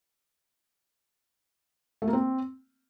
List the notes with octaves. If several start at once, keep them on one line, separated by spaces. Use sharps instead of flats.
A3
A#3
C4